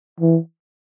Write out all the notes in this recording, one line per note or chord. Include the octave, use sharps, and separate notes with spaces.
E3